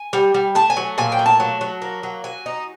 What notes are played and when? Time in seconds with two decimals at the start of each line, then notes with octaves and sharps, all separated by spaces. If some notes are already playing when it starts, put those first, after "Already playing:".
Already playing: G#5
0.13 G3
0.34 G3
0.55 A3 A5
0.70 G#5
0.77 F#3
0.98 A#2 G#5
1.12 G5
1.19 A3
1.26 A5
1.40 F#3
1.61 F#3
1.82 A#3
2.03 F#3
2.24 F#3 G#5
2.46 D#4